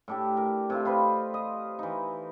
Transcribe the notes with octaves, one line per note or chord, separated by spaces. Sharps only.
A2 D4 G4
A#4
C3 A3 F4
F4 B4 C5 D#5
D#5
E3 D#4